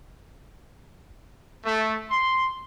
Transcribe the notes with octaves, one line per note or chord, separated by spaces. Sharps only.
A3
C6